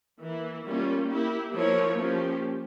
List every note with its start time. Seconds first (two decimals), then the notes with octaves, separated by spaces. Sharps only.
0.20 E3 A#3 E4
0.65 G3 A#3 C#4 F4
1.08 A#3 E4 G4
1.52 F3 A#3 E4 A#4 C#5
1.97 F3 A#3 C#4 G4